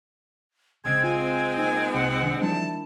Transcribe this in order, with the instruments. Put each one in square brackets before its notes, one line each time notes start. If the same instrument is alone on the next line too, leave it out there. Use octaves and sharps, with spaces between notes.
[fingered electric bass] A#1 C#3 [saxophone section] G#3 C4 [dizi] G#6
[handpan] F4 [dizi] G#5
[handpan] A#3 D#4 [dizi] G#5
[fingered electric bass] C2 [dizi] F#5
[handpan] D#3 D4
[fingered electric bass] E3 F3 G3 [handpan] D4 E4 [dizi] A5